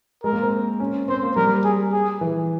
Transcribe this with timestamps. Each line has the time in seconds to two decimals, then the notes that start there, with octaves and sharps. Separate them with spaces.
0.24 G#3 A#4
0.33 A#3
0.42 C4
0.80 C#4
1.09 C4 C5
1.23 A#3
1.36 G3 A#4
1.65 G#4
1.92 G#4
2.21 E3